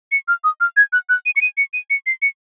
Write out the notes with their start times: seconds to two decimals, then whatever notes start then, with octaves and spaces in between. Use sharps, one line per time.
0.12 C#7
0.28 F6
0.44 D#6
0.61 F6
0.77 G#6
0.93 F#6
1.09 F#6
1.26 D#7
1.36 C#7
1.41 D#7
1.57 C#7
1.73 D#7
1.90 C#7
2.06 C7
2.22 C#7